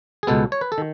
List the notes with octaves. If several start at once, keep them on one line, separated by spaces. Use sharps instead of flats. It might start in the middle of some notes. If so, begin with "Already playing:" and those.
G#4
C#2 B2 G#3 B3 A4
C#5
B4
A4
D#3